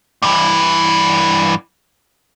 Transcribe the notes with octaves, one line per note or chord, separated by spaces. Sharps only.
G2 E3